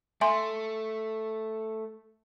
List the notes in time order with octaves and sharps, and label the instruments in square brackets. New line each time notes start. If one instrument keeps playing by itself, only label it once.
[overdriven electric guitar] A3 [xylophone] E5 G#5 C6